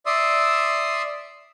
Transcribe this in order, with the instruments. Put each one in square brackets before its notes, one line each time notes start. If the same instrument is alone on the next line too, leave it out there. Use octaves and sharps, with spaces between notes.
[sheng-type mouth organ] D5 E5 C6 D#6 E6